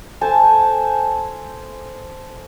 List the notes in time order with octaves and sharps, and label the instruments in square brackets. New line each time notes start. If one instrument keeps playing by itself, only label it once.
[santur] A4 C5 G#5 A5